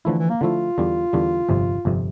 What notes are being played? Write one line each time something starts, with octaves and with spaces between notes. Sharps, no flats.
D3 E3 F3 A3 E4
E3
A#3
D3 F3 A3 E4 F4
E2 D3 G3
E2 D3 G3
G1 F2 C3
G1 F2 C3